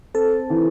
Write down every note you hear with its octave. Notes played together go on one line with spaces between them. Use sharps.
C4 A4
E3